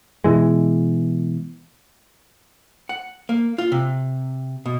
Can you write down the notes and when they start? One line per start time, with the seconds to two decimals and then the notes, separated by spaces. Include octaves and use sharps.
0.24 B2 E3 G#3
2.89 F#5
3.29 A#3
3.58 F4
3.72 C3
4.66 B2